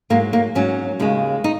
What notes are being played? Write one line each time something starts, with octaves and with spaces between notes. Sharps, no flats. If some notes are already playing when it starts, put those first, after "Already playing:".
G#2 F#3 A#3
A#3
G#2 F#3 C#4
D#2 C#3 G#3
D#4